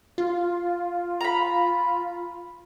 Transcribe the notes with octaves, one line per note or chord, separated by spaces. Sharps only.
F4
A#5 B5